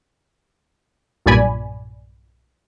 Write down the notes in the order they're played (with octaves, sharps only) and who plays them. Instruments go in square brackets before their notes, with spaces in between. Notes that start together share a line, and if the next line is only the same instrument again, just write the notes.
[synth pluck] B1 G2 A#2 D5 G#5 B5